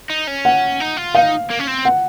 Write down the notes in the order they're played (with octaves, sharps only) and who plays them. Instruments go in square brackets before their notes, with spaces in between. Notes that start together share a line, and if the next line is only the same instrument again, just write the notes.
[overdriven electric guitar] D#4
C#4
[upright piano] F#5
[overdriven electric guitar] D#4
F4
[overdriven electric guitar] D#4 [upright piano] F5
[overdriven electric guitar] A#3
C#4
C4
[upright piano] F#5